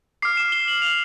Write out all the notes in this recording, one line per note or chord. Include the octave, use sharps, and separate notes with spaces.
D6 F6 C7
E7
G7
F#7
F7